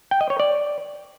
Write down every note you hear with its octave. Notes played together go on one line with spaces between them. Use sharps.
G5
D#5
C#5
D5